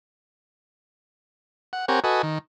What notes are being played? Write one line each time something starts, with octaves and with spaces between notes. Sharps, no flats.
F#5
C4 G4 A#4 C#5 F#5 G#5
F#4 A4 B4 D#5 G#5
D#3